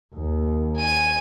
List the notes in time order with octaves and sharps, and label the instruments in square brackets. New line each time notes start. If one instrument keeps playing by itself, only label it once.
[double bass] D#2
[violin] G#5 D#7